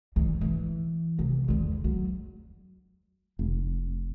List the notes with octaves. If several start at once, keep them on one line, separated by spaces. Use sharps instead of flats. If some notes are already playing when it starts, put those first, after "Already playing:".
D3 E3
E3
C3
E2 D3
F#3
F1